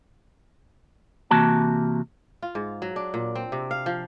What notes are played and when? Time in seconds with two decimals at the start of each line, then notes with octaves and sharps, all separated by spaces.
1.31 C3 E3 A#3 F#4 A5
2.42 F4
2.55 G#2
2.82 F#3
2.96 D4
3.14 A#2
3.35 C4
3.52 C3
3.71 F5
3.86 F3